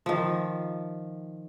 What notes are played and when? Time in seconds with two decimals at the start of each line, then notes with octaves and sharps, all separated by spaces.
0.06 D#3 F3